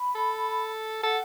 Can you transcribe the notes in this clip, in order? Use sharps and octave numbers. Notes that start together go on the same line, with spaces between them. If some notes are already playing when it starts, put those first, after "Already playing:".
Already playing: B5
A4
A4 F#5